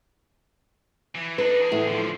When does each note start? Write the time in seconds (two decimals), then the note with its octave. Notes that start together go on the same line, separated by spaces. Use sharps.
1.15 E3
1.38 D4 D#4 B4
1.59 E3 G#4
1.71 E2 A2 A3
1.87 D3 F3